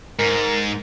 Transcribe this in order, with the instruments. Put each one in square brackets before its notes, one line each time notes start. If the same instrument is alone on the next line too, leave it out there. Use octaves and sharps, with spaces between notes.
[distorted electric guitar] G#2 [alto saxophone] A#4